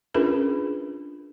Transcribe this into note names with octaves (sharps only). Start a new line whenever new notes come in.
C#4 D4 F4 G#4 A#4 B4